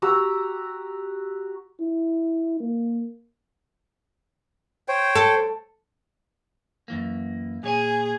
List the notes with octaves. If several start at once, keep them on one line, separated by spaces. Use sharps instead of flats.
F#4 G4 A#5 E6
E4
A#3
C5 C#5 G5
A4
F#2 E3 A#3
A#2 G#4 C#5 G#5